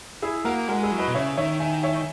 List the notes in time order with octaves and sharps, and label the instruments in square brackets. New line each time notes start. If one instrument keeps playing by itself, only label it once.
[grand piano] E4 G#4
[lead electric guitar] A#3 [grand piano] F#4 A#4
[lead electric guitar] G#3 [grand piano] F#4 A#4
[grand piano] E4 G#4
[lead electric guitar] F#3
[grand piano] B4 D#5
[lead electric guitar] B2
[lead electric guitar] C#3 [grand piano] C#5 E5
[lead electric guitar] D#3 [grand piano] C#5 E5
[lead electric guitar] D#3 [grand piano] E5 G#5
[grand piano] C#5 E5